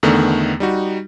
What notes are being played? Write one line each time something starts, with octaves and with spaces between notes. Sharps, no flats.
E2 D3 D#3 A3 B3
G3 D#4 F#4